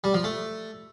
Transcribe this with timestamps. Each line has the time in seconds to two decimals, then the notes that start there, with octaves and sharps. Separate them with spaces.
0.04 G3
0.14 F3
0.24 A3